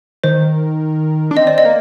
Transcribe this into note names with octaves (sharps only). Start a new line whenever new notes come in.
D#3 C5
D4
C4 D#5
D5
D#5
A#3